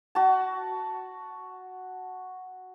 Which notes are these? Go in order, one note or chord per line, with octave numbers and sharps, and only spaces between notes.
F#4 A5